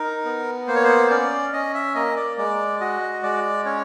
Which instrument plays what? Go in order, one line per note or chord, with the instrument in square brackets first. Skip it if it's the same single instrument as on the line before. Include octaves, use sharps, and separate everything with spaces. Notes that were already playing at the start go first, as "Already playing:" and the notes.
Already playing: [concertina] D#4 A#4
B3
A#3 C5
C#5
C5
C#4 D5
C#4 D#5
E5
A#3 D#5
D5
G#3 D5
F#4 D#5
G#3 D5
C#4 C#5